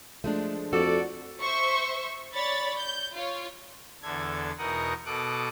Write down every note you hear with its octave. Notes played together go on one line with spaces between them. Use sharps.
F3 G#3 A3 D4
F2 F#4 A4 D5
C5 E5 C#6
C#5 D5 B5 A6
G6
F4 C#5
E2 D3 A4 G#6
E2 B2 D#4 A#4 F#5 D#6
B2 A4 D6 D#6 F#6